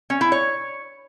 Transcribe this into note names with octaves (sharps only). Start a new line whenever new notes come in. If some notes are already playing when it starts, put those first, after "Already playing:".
C#4
E4
C#5